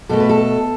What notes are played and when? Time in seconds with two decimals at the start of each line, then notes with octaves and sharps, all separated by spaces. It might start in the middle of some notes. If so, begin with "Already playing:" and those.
0.09 B2 A3 A4
0.20 B4
0.29 A4